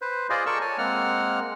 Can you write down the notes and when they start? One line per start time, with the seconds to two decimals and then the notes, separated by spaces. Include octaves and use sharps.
0.02 B4 C5
0.30 F4 G#4 C5 D5 D#5
0.46 A4 A#4 D5 C#6 E6
0.61 C#5 G#5 A5
0.78 G#3 A#3 C4 F#5 F6